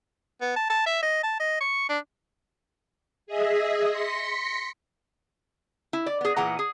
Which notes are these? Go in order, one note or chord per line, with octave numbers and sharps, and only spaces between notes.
B3
A5
A5
E5
D#5
A5
D#5
C#6
D4
G#4 D#5 E5
C6 A#6 B6 C#7
E4
D5
B3 G#4
A#2 E3 G#4 F#5 A#5
G#4